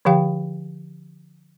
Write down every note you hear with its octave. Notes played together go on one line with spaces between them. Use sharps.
D3 F3 G4 F5 G5